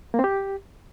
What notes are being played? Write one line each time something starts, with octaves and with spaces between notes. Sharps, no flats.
A#3
C4
G4